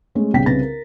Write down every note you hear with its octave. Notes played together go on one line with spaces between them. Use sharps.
G#3 A3 C#4
G1 C2 C#3 G5 B6
C2 C#3 B4 A6 A#6
A#4